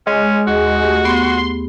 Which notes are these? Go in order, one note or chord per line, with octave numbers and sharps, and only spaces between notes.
G#3 C#4
D#2 F#4 G#4
A3 G4 G#4
B3 C6